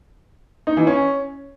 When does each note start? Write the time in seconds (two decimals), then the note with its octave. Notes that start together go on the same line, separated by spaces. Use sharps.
0.67 D#4
0.77 E3
0.87 C#4